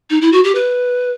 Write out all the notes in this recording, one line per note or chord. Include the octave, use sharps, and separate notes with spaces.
D#4
E4
F#4
G4
B4